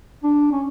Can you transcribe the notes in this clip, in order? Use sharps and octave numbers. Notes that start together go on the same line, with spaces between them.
D4
C#4